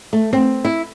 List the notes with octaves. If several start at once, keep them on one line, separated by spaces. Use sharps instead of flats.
A3
C4
E4